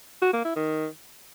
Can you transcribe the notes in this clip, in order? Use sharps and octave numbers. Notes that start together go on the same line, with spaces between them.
F#4
A#3
E4
D#3